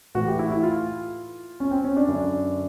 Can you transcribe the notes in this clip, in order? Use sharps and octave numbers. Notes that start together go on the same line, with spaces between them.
A2 E3 F#4
G4
E4
E4
F4
C#4
C4
C#4
D4
F#2 D3